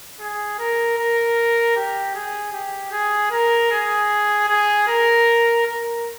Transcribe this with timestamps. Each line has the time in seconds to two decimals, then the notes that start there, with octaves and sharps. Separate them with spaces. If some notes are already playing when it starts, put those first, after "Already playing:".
0.20 G#4
0.59 A#4
0.98 A#4
1.76 G4
2.15 G#4
2.53 G4
2.92 G#4
3.31 A#4
3.71 G#4
4.49 G#4
4.87 A#4
5.65 A#4